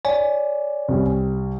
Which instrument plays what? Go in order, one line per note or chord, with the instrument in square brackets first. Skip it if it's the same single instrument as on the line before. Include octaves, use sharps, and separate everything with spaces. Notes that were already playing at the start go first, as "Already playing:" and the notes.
[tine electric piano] C#5 D5 G#5
[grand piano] C2 G3